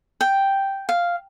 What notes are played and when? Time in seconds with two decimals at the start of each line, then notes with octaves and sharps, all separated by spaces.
0.21 G5
0.89 F5